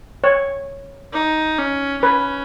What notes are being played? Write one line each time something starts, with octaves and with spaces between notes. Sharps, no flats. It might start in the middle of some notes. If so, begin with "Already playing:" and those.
C#5
D#4
C#4
C#4 B4